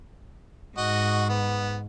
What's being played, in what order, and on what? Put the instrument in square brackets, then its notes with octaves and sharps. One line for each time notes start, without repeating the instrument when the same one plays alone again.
[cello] G#2 [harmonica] F#4 D#5
[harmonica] B3